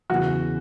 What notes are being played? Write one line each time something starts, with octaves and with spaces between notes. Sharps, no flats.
E2 C#3 E3 F#4